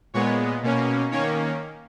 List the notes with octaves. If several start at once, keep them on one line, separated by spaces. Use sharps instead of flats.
A#2 G#3 B3 C#5
B2 A#3 C#4
D#3 A#3 C#4 C#5